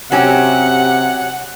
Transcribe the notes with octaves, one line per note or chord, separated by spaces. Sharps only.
C3 F#3 C#4 G4 F#5